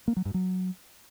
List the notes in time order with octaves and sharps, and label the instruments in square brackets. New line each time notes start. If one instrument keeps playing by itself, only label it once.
[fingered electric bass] A#3
F#3
G2
F#3